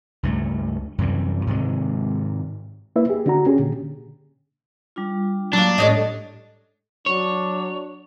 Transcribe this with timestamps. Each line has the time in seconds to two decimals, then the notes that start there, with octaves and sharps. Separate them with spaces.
0.23 C#2 G2 A3
0.98 F#2 C3 E3 G3
1.47 G#2 C3 D#3 G#3
2.96 A#3 E4 B4 E5
3.09 G4 G#4
3.26 D3 D4 F#4 A#5
3.46 C#4 G4 G#4
3.59 A#2 D3
4.96 G3 D4 F4
5.53 F#3 A#3 D4
5.78 A2 G#3 G4 A4 C#5 D#5
7.06 F#3 D4 C#5